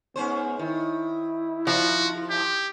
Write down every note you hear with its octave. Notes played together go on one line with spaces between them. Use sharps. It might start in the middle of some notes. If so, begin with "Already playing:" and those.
G#2 B3 C#4 C5
D#3 E4
F3 F#4
G4